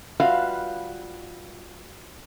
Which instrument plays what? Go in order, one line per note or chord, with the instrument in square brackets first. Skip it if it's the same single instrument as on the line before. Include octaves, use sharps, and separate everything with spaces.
[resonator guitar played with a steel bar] G3 F4 F#4 B4 E5 F5